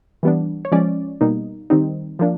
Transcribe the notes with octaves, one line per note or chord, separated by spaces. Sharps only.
E3 G3 B3 D4
C#5
F3 G#3 C#4 D5
B2 G3 A#3 D#4
D#3 G3 C4 D#4
F3 A#3 D4